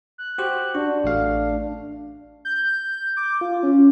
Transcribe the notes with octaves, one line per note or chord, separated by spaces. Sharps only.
F#6
F#4 G4 C5
D4 F#4
A1 A3 F5
G6
D6
F4
C#4